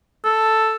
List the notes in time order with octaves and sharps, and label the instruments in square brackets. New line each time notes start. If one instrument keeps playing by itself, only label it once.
[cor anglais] A4